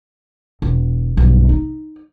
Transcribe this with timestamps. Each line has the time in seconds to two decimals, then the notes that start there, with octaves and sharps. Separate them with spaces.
0.62 E1
1.17 B1 G2
1.49 D#4